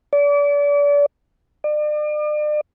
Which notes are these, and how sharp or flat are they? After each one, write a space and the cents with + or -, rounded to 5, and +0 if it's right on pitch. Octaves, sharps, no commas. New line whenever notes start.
D5 -35
D5 +40